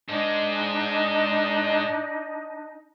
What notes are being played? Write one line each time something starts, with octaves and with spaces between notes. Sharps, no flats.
G#2 G#3 D4 D#4 D#5